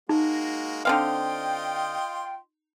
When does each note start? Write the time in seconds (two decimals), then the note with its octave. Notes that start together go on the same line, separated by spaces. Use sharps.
0.09 G#3 A#3 D#4 F#4
0.85 D3 C4 F4 D#5 F5 G5 C6